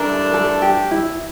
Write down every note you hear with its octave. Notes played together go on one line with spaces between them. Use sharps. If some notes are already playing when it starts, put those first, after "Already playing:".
Already playing: G2 E3 A3 D4 A#4
A4
G4
E4